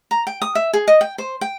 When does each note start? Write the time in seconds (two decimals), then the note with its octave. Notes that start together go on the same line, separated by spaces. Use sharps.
0.11 A#5
0.27 G5
0.42 D#6
0.55 E5
0.73 G#4
0.88 D#5
1.01 G5
1.18 C5
1.41 G5